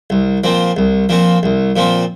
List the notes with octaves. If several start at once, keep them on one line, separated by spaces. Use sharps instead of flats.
C2
A#2 F3 C4
C2
A#2 F3 C4
C2
A#2 F3 C4